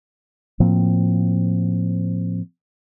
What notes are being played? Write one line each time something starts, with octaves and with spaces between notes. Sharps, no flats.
A2 F3 A#3 C4